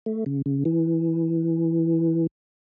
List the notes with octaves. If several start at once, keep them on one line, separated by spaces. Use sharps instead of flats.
A3
C#3
C#3
E3